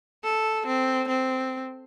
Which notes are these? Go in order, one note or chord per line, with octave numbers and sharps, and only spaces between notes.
A4
C4
C4